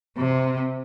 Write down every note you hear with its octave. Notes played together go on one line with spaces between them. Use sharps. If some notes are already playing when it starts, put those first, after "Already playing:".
C3